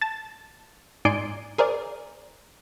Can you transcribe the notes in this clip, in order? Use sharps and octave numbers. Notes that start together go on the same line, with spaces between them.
A5 A6
G#2 D#4 D5 G#5 C6 D7
G#4 A#4 C5 D5